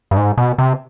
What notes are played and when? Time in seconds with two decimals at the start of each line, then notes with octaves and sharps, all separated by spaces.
0.11 G2
0.17 G#2
0.37 B2
0.58 C3